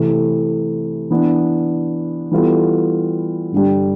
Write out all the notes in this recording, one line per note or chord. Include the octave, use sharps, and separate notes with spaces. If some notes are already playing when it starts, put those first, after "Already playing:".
Already playing: C3 E3 A3
E3 B3 D4
E3 G3 B3 F4 A4
G2 D3 G3